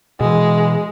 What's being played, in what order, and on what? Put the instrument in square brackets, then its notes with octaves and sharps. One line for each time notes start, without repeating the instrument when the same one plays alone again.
[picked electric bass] B2 E3 [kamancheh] G#3